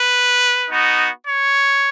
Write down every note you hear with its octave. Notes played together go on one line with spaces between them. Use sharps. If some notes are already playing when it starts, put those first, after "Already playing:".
Already playing: B4
B3 D#4 F#4
C#5